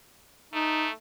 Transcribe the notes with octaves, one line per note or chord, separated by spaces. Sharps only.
A3 D#4